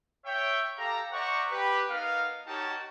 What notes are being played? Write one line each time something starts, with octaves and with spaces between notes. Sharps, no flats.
C#5 E5 G5
G4 A4 F5 A#5
C5 D5 E5 F#5 A#5 C#6
G4 B4
B3 D#4 A#4 F5
D#4 F#4 G4 A#4 C#5 A5